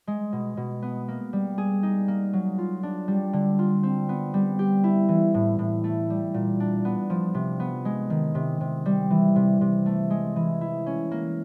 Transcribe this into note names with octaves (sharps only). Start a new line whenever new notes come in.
G#3
B2
B2
B3
A#3
G3
G#4
D#4
A#3
F#3
F4
D4
G3
D3
F4
C4
B3
G3
G4
E4
E3
A2
A2
A3
G3
A#2
D4
B3
F3
C3
B3
G#3
D#3
C3
C3
G3
E3
C3
C3
A3
G#3
E3
E4
C#4
A#3